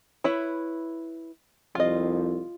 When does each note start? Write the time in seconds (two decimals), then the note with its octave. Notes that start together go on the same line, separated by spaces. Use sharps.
0.24 E4 B4 C#5
1.75 C2 F2 F4 D#5